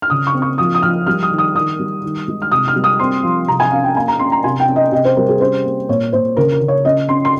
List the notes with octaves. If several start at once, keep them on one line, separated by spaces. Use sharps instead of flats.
F6
C#3 D#6
C#6
C4
C#6
F3 D#6
D#6
F3 F6
G3 F6
D#6
D#3
D#6
D#3 D#6
G3
D#3
G#3
F6
C3 D#6
F6
G3
D#6
C4 C6
F3
C3 A#5
G#5
C#4 F5
G5
A#3 G#5
A#5
C#4 C6
A#5
C3 G#5
G5
C#4
D#5
C3 D#5
C5
G3 A#4
G#4
C#4 C5
A#3
A#2 C#5
A#2 C5
C#3 A#4
A#4
C#3
C#5
C#4 D#5
C#4 C6
C6